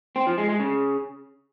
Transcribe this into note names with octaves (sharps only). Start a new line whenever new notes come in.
C4
F3
G#3
G#3
C#3